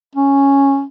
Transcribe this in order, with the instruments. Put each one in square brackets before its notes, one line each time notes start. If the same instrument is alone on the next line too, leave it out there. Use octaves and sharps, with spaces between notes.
[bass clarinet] C#4